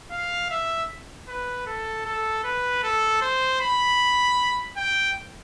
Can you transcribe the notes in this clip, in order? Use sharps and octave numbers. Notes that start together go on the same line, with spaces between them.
F5
E5
B4
A4
A4
B4
A4
C5
B5
G5